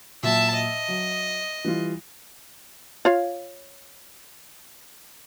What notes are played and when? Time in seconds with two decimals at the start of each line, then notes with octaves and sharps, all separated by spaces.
0.23 A#2 F#3 E5 A5
0.55 D#5
0.88 F#3
1.65 E3 G3 F4
3.05 F4 C#5 F5